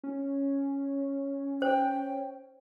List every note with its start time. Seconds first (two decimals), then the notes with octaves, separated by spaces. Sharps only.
0.04 C#4
1.62 C5 G5